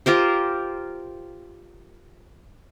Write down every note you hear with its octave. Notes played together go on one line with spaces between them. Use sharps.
F4 G4 A#4 C5